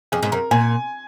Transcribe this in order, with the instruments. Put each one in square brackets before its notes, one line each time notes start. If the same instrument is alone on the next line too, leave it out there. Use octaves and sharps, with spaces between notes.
[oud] F2 [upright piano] G#4
[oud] G#2
[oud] F#2 [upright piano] A#4
[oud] A#2 [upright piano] G#5